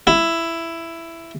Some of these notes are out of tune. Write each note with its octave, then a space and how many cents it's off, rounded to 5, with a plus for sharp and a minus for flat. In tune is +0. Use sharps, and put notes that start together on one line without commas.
E4 +10